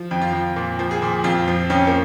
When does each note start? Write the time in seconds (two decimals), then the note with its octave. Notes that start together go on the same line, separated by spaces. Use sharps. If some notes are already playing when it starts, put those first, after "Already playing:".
Already playing: F3
0.11 F2
0.22 F4
0.33 F2
0.56 A#2
0.79 F3
0.91 G#4
1.02 A#2
1.24 F2 F4
1.48 F3
1.70 F2 C#4
1.87 A#3